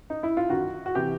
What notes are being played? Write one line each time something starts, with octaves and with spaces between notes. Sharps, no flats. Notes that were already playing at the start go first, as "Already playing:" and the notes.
D#4
E4
F4
F#2 D#3 F#4
F#4
C3 E3 G4